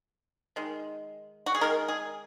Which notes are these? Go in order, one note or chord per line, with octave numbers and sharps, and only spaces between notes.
D#3 G#3
F#4
G#4
D#3 G#3 A#4
G#4